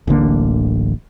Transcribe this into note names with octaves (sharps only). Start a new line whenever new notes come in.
D1 A1 D3 A#3